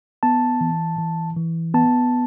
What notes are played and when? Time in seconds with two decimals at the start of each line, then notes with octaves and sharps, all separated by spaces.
0.23 B3 A5
0.61 E3
0.98 E3
1.37 E3
1.74 B3 A5